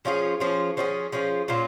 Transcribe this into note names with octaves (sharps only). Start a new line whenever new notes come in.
F3 C#4 F4 G#4
F3 C#4 F4 G#4
F3 C#4 F4 G#4
F3 C#4 F4 G#4
A#2 A#3 C#4 F4